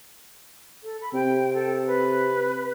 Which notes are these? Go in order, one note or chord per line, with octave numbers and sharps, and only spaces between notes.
A4
B5
C3 G5
A4
B4